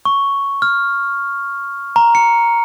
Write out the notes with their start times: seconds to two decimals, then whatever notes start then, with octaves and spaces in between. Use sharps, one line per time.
0.05 C#6
0.62 F6
1.96 A#5
2.15 C#7